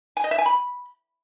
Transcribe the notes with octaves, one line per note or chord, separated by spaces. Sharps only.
G#5
D#5
E5
G#5
B5